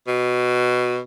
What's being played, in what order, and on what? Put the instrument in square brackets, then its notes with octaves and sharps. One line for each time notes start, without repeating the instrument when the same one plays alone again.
[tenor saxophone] B2